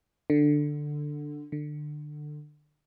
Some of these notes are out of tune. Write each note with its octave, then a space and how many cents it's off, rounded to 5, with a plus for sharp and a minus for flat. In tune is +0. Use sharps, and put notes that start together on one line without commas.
D3 +10
D3 +25